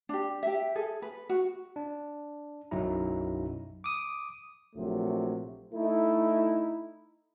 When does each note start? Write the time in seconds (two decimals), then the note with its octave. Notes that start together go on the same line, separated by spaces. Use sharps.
0.09 D4 G4
0.43 G4 E5
0.75 G#4 A4
1.02 B4
1.29 F#4
1.76 D4
2.71 B1 F#2 F#3 D#4 E4 A#5
3.84 D6 D#6
4.75 A#1 C3 F#3 A3
5.73 A3 D#4 E4